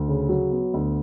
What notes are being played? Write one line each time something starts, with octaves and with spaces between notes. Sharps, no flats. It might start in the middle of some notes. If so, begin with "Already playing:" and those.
Already playing: D2
C#3
F#3
B3
D2